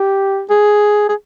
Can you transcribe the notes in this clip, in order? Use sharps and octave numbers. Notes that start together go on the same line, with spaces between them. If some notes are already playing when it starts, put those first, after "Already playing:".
Already playing: G4
G#4
G#4